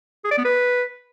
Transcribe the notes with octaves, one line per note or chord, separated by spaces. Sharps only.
G#4
D5
B3
B4